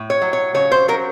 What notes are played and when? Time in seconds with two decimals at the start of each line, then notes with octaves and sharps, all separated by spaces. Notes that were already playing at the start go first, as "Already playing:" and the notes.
Already playing: A2
0.10 C#5
0.22 F#3
0.33 C#5
0.54 C#3 C#5
0.71 C5
0.88 F#3 A#4